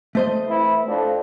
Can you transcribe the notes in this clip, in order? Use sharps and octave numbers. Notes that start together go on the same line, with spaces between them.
A3 C5 D#5
E3 C4 E4
F2 D4